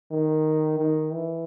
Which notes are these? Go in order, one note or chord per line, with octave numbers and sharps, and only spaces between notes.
D#3
D#3
E3